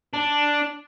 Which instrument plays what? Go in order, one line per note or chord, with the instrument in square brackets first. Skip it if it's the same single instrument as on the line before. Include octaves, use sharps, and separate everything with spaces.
[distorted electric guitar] D4